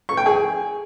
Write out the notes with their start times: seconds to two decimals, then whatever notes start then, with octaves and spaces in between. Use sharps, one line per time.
0.09 C#6
0.17 G5
0.26 G#4